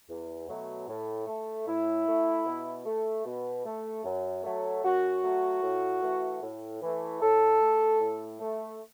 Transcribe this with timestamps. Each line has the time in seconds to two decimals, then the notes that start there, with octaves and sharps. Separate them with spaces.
0.08 E2
0.48 B2 F#3 A3
0.87 A2
1.27 A3
1.66 A2 E4
2.06 A3
2.45 B2
2.85 A3
3.25 B2
3.65 A3
4.04 F#2
4.44 F#3 A3
4.83 F#2 F#4
5.23 F#3 A3
5.62 A2
6.02 E3 A3
6.42 A2
6.81 E3 A3
7.21 A2 A4
7.60 A3
8.00 A2
8.40 A3